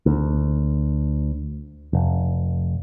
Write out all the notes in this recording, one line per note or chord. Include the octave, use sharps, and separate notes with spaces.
D2
F1